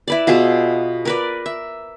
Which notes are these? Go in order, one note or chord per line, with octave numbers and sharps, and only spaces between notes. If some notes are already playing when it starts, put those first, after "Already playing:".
E4 B4 D5
B2 F4 G#4 E5
A#4 B4 D5
E5